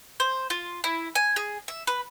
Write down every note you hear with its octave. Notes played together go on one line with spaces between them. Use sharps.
C5
F4
E4
G#5
G#4
E5
B4